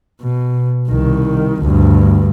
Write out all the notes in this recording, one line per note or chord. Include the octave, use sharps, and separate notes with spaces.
B2
C2 D#3
D2 G2